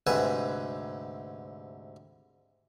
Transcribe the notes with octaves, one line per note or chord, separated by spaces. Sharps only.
D2 G#2 C3 B4 E5 G#5